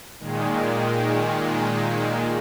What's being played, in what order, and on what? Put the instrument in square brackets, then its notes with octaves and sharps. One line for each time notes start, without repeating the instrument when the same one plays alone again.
[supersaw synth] A#2 D#3 G#3